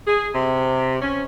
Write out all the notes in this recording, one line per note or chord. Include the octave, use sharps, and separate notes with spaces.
G#4
C3
C#4